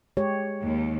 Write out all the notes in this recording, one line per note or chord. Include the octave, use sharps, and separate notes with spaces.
G#3 G4 C#5
D#2